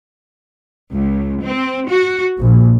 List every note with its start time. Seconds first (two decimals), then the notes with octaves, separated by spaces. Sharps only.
0.93 C#2
1.42 C4
1.89 F#4
2.39 A#1